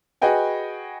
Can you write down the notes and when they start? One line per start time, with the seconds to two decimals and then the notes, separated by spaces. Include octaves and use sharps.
0.22 F#4 G#4 B4 D#5 G5 G#5